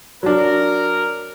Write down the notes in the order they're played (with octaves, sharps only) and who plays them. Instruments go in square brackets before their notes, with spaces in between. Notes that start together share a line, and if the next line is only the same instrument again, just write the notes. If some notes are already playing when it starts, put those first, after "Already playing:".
[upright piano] F#3 D4 [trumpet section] A#4